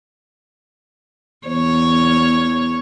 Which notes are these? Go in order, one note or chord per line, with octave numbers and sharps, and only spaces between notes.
E2 C#5